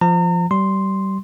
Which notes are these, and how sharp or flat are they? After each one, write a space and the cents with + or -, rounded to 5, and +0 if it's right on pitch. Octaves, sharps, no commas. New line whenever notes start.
F3 -10 A#5 -40
G3 -25 C6 +0